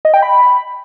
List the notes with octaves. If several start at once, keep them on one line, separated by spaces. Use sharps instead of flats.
D#5
G5
B5